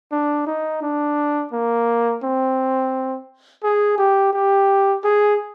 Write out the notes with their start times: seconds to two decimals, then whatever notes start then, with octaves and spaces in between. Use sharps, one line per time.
0.12 D4
0.47 D#4
0.83 D4
1.53 A#3
2.23 C4
3.64 G#4
3.98 G4
4.33 G4
5.04 G#4